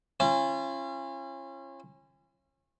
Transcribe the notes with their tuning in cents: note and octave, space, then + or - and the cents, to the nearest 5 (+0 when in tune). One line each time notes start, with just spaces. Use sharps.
C#4 -30 F4 -40